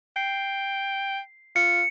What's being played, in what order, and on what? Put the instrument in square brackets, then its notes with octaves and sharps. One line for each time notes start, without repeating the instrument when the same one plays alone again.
[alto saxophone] G5 [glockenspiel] C7
[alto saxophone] F4 [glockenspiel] C#7